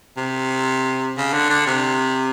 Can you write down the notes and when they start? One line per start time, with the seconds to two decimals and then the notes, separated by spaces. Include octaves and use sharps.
0.17 C3
1.17 C#3
1.33 D3
1.50 D3
1.67 C3